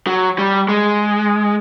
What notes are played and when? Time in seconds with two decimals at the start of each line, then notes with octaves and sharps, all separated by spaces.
0.07 F#3
0.39 G3
0.69 G#3